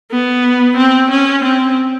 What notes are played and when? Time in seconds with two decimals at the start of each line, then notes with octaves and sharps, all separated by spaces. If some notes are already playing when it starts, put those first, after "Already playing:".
0.11 B3
0.77 C4
1.10 C#4
1.44 C4